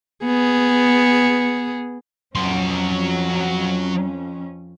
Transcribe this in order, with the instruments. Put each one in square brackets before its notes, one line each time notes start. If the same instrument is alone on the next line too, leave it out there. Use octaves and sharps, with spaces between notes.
[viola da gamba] B3 G#4
[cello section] F2 C#4 [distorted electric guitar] F#3 C6